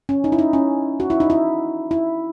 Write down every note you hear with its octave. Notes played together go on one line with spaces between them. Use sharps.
C#4
D#4
E4
D#4
C#4
F#4
E4
D#4
E4
E4